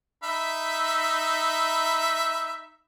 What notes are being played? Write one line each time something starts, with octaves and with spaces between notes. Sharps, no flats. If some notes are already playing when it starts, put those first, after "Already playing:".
D#4 E5 B5